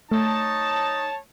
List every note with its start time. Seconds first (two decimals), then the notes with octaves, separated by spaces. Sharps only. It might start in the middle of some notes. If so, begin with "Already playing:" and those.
0.12 A3 D#4 C#5 A5